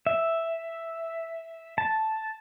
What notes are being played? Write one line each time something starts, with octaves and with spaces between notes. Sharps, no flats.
E5
A5